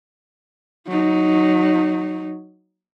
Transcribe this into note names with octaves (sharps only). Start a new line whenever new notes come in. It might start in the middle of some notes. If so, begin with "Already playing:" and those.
F#3 D#4